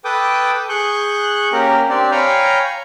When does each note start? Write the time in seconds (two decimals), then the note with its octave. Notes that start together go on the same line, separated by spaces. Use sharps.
0.05 A4 B4 G5 D6 D#6
0.69 G#4 C#6 F#6 G6
1.52 A#3 C#4 G4 A#4
1.89 C4 D4 G4 D5
2.12 C#5 F5 G5 G#5 A#5 B5